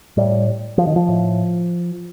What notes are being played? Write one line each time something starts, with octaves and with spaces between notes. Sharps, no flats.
A2 G3
F3
D#3
F3
A2